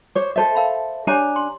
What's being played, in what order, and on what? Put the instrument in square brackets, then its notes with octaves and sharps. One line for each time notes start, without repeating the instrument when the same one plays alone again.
[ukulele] C5 C#5 [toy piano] D6
[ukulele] A4 C5 E5 [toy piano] D#5 A5
[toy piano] A#4 F5 B5
[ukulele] D4 G#5 A#5 [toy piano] G4 C#5
[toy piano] C6